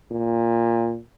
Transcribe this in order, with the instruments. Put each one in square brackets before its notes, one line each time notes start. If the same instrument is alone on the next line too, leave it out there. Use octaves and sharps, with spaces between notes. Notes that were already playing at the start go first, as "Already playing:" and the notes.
[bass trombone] A#2